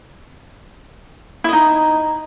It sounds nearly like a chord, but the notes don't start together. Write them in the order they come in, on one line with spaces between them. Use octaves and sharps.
E4 D#5 D#4